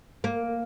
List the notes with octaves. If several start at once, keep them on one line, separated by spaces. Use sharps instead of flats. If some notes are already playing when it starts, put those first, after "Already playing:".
A#3